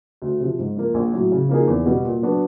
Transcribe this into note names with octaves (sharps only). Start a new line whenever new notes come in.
D2
C3 F3
G#2
F3 A#3
A#1
A2 F#3
C#3
F3 A#3 D#4 G#4
E2
B2 G3
A#2
F#3 B3 D4 F#4